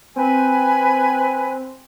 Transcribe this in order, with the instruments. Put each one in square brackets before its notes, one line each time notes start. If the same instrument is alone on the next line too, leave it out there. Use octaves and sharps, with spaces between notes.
[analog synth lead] C4 [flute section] B4 G#5